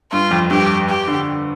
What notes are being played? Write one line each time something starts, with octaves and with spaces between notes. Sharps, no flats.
G2 F4
F2
G2 G4
G4
D3